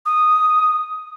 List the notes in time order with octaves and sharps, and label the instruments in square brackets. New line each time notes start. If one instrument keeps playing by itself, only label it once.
[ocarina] D#6